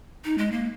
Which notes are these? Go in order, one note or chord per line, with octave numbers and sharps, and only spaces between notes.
D#4
G#3
A#3